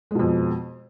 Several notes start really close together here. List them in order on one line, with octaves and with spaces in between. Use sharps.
G#3 B2 F2